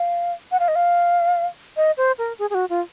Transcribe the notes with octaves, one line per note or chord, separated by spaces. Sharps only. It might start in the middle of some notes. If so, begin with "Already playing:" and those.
Already playing: F5
F#5
F5
D#5
F5
D#5
C5
A#4
G#4
G#4
F#4
F4